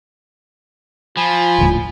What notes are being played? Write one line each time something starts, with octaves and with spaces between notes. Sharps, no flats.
F3 F4 G#5 B5
D#1 D2 A2